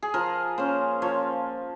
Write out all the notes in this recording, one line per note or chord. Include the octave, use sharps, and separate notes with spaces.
G#4
F3 A#4
A#3 C#4 C5
F3 C#5